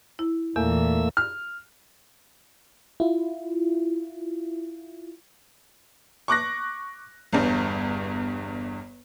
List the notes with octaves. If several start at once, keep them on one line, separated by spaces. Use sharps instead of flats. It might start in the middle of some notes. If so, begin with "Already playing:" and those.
E4
E2 A#2 E3 A3 A#3 E6
F6
E4 F4
C#6 D6 F#6 A#6
G1 E2 G2